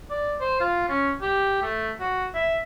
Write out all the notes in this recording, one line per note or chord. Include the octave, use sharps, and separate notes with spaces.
D5
C5
F4
C#4
G4
A3
F#4
E5